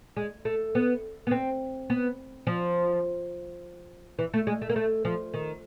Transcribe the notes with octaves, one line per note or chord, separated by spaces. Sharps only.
G#3
A3
B3
B3
C4
B3
F3
E3
A3
G#3
A3
A#3
A3
F3
D#3